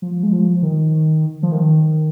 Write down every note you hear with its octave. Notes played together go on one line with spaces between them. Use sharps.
F3
G#3
F3
D#3
F3
D#3